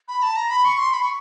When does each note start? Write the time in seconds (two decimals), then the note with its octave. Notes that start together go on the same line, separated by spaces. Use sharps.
0.08 B5
0.23 A5
0.36 A#5
0.50 B5
0.65 C#6
0.79 C6
0.93 B5
1.02 C#6